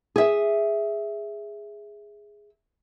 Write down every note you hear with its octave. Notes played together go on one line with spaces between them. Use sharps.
G#4 E5